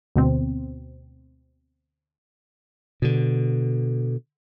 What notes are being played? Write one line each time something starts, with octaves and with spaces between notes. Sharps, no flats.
D2 B2 C4
B2 D3